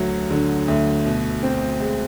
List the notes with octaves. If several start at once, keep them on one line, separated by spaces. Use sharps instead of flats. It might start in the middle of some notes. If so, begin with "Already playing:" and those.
Already playing: D2 F#3
D3
D2
B2
C4
G#3